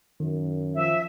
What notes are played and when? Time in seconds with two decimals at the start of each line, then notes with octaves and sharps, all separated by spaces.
0.20 F#2 D#3
0.76 F3 E5